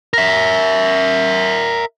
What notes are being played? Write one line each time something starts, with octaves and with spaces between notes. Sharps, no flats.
A#4 E5